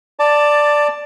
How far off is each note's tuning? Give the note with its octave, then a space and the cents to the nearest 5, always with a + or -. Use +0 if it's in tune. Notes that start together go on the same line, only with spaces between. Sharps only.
D5 +0 A5 +10